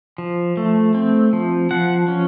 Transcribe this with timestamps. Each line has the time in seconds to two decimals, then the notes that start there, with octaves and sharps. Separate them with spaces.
0.18 F3
0.57 A3
0.95 C4
1.33 F3
1.71 F3 F#5
2.08 C#4